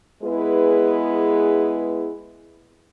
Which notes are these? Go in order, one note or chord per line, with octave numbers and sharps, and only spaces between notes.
G#3 B3 E4 G#4 B4